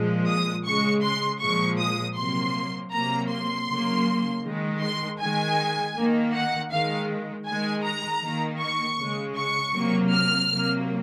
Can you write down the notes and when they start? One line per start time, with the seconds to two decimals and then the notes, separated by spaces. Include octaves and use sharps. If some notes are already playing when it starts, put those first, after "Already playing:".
Already playing: A#2 F3 G#3
0.28 D#6
0.65 C#3 G#3 C#6
1.04 C6
1.42 A#2 F3 G#3 C#6
1.80 D#6
2.17 C3 F#3 A#3 C6
2.93 C3 F#3 A#3 A#5
3.31 C6
3.69 C#3 F#3 A#3
4.44 D#3 G#3
4.82 C6
5.20 D#3 G#3 G#5
5.96 D#3 A#3
6.34 F#5
6.72 D#3 G#3 F5
7.47 D#3 G#3 G#5
7.85 A#5
8.23 D#3 A#3
8.61 C#6
8.99 C#3 G#3
9.37 C#6
9.75 C3 F#3 A#3
10.13 F6
10.50 C3 F#3 A#3